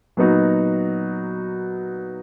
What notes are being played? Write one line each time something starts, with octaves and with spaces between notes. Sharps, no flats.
A#2 F#3 B3 D#4 F#4